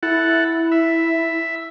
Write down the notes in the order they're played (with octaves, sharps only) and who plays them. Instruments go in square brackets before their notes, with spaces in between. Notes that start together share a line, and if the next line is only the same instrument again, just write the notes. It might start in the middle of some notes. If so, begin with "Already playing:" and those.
[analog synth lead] E4 [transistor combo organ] A4 F#5
[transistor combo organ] E5